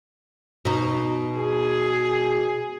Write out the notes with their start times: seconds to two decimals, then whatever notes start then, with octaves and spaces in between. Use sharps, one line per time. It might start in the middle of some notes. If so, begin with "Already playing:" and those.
0.65 B2 D#4
1.34 G#4